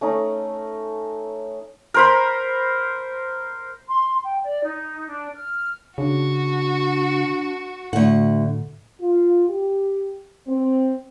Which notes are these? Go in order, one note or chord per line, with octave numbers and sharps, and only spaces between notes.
A3 C#4 D#4
A#4 C5 B5
C6
G5
D5
D#4
D4
F6
C#3 D4 F#4
D2 A2 D3 F#5
F4
G4
C4